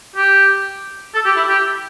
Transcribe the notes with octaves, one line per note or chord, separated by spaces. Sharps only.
G4
A4
G4
E4
G4